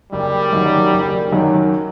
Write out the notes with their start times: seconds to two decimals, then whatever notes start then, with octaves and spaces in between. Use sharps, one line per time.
0.12 F#1 G3
0.53 F#2 D#3 F#3
0.92 F#1
1.32 F#2 D#3 F#3